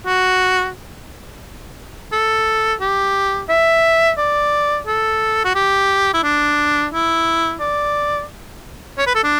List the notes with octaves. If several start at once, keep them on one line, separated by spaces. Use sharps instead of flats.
F#4
A4
G4
E5
D5
A4
F#4
G4
E4
D4
E4
D5
C#5
B4
A4
D4